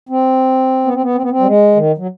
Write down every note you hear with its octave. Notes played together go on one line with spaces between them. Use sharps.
C4
B3
C4
B3
C4
B3
C4
G3
G#3
D#3
F#3